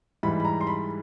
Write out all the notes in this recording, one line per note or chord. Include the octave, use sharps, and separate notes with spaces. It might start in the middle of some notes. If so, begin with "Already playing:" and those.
G#2 E3 G3 B5
B5
A#5
C6
B5